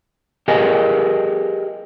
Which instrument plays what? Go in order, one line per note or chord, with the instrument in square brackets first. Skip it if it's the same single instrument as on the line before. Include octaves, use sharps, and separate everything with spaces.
[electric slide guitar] G4 G#4 A#4 B4 D#5 G#5